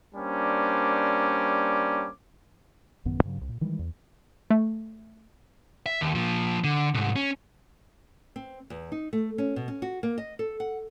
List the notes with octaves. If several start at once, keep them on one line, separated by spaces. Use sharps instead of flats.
G3 A#3 C#4 D4 C5 D6
A1 F#2 D#3 B3
G2 C#3 F#3
D#1 C2
A#2
D#3 E3 G3 G#3
E2
A3
E5
D#2
A#2 F3
D3
C2 G#2
C#4
C4
E2
D#4
A3
C#4
B2
C#4
F#4
A#3
D#5
A4
F#5